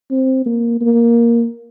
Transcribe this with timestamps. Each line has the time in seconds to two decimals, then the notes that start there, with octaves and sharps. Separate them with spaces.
0.11 C4
0.46 A#3
0.81 A#3